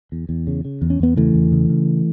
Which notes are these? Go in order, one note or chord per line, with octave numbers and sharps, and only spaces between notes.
E2
E2
C#3
C#3
E2
C#4
E2 B3
C#3 E3 A3
E2
C#3
C#3